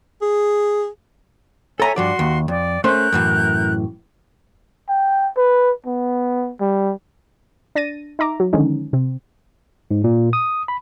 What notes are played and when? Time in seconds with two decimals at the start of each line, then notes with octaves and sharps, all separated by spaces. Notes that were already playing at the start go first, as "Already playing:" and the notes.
0.22 G#4
1.80 A4 C#5 E5 G#5 A#5
1.96 G2 F3 F#4 D5 C6
2.19 D#2
2.48 F2 D5
2.84 A3 C#4 A#4 C5 F#6 G6
3.12 F#2 A2 E3
4.88 G5
5.37 B4
5.86 B3
6.60 G3
7.75 D4 A6 A#6 D#7
8.19 D#4 E5 A#5 D6
8.40 F#3
8.53 D3 D#3 F3 G#3 C#4 D#4
8.93 C3 C4
9.91 G#2
10.04 A#2
10.33 D#6
10.68 B5